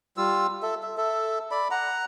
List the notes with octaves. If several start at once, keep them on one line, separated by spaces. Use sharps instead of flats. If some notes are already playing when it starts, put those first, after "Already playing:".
G3 F4 E6
A4 E5
E5
A4 E5
D5 B5
F#5 A#5